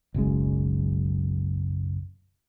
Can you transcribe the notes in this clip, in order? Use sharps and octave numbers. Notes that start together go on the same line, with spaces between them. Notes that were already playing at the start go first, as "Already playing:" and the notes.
F#1 B1 F#2 G#3